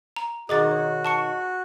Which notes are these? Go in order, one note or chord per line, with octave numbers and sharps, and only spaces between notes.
A#5
B2 D#3 F#4 G#4 D#5 D6 A6
C#5
A5 C#6 C#7